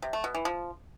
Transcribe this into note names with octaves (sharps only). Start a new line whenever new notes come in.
C3
A3
B2
E3
F3